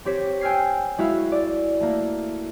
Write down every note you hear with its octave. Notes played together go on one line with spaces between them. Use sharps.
C4 G4 C#5 B6 E7
G5 G#5 E6 F6 G#6 C7
G#3 E4 F#4 E5 F5
D5
A3 A#3